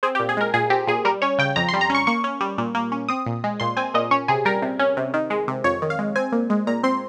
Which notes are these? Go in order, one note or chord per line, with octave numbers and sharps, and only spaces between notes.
C4 G#4
G4
A#2
G#4
G#3 A#4
A#2 G#4
C4 G4
A#2 G#4
G3 A#4
C#4 C#5
C#3 G5
F2 A#5
C6
G3
A#5
C#4 C#6
A#3 C#6
C#4
G3
A#2
A#3
C#4
C4 D#6
A#2
G#3
A#2 C6
C4 G#5
A#2 D#5
C#4 C#5
C3 G#4
G3 A#4
C3
C#4
C3
D#3
G#3
C3
F2 C#5
D#3
F5
G#3
C4 G#5
A#2
G#3
A#2 A#5
C4 C6